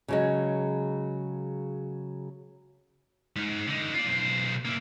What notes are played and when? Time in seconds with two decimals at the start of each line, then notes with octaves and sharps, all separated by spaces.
0.08 C#3 F#3 G#3
3.36 G#2
3.68 D3 D#4
3.94 F4 D5
4.07 B1 C5
4.65 A#3 E4